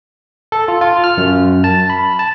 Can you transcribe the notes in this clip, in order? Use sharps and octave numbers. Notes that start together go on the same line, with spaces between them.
A4
F4
F4
F6
F#2
A5
B5
A5